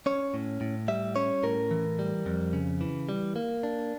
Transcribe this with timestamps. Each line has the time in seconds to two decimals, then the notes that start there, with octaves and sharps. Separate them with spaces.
0.06 C#4 C#5
0.34 A2
0.61 A2
0.88 G3 E5
1.16 C#4 C#5
1.43 A2 A#4
1.71 E3
1.99 G3
2.26 F2
2.53 C#3
2.81 E3
3.09 G3
3.36 A#3
3.63 D4